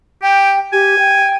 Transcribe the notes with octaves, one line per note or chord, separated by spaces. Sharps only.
G4 G5
G4 G#5
G5